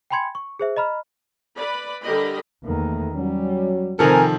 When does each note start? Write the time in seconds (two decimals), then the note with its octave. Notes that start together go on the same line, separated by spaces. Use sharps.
0.10 G5 G#5 B5 C6 G#6 C#7
0.35 C#6
0.59 G#4 C5 E5
0.77 D#5 A#5 B5 F6
1.57 B4 D5 B5
2.04 D3 G3 G4 A#4 D#5 B5
2.64 E2 D#3 A3 A#3
3.14 F#3 G3 C#4
3.99 C3 D#3 F3 C4 A4 A#4 G#5